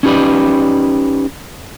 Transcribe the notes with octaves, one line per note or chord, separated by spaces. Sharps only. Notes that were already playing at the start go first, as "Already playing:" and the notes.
C#4 D#4 G4 B4 D5